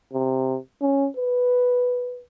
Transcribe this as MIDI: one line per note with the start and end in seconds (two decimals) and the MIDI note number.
0.13 0.57 48
0.81 1.08 61
1.16 2.21 71